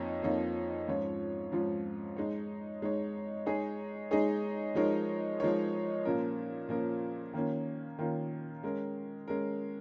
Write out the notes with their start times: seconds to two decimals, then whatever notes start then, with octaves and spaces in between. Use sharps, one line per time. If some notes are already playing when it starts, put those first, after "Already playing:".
Already playing: F2 F3 A#3 D#4 C#5
0.23 F2 F3 A#3 D#4 C#5
0.88 G#2 F3 C#4 F4 C#5
1.52 G#2 F3 C#4 F4 C#5
2.16 G#3 D#4 C#5
2.82 G#3 D#4 C#5
3.46 G#3 D#4 G#4 C#5
4.11 G#3 D#4 G#4 C#5
4.75 F3 G#3 D#4 A#4 C#5
5.40 F3 G#3 D#4 A#4 C#5
6.05 A#2 F3 C#4 A#4
6.69 A#2 F3 C#4 A#4
7.33 D#3 A#3 C#4 F4
7.99 D#3 A#3 C#4 F4
8.63 G#3 C#4 A#4
9.28 G#3 C#4 A#4